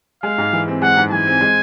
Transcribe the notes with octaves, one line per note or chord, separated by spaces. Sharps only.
G#3 F5
G#2
E3
C4
G#3 F#5
G#2
E3 G#5
C4
G#3